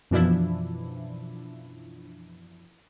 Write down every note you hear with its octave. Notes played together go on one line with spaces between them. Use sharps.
F#2 B2 E3 F3 D4 E4